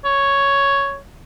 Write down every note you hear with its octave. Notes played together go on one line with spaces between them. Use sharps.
C#5